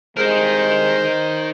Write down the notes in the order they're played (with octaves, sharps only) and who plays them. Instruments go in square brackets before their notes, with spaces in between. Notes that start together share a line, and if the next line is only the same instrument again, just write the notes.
[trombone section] C2 G#3 [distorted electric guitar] D#4 A#4 [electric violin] C5